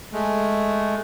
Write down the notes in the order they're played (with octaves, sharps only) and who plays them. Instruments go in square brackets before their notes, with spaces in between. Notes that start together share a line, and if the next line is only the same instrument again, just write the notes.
[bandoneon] G#3 A3